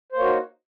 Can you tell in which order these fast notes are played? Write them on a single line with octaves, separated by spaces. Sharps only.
C5 A#3 C#5 F#4 D#4